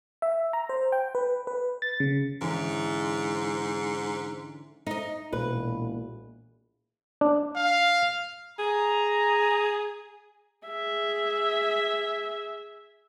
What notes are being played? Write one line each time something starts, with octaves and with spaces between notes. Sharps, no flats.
E5
A#5
C5
G5
B4
B4
A6
C#3
G#2 D3 E3 C#4
D#4 D#5
E1 B1 A#2 B4
D4
F5
G#4 A#5
G#4 E5